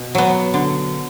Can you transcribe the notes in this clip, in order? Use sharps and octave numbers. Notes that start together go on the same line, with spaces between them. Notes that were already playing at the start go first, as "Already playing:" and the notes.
Already playing: B2
F#3 B3
D3